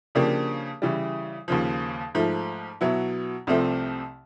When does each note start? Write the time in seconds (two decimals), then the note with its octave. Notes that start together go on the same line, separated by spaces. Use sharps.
0.15 C#3 F3 A#3 D4 G4
0.82 C#3 E3 G3
1.48 D#2 C#3 F3
2.15 G#2 F3 A3
2.81 B2 F#3 B3 E4
3.47 C2 C3 F3 A3 C4